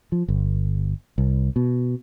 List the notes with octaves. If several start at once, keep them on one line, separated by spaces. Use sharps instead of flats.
F3
G1
C2
B2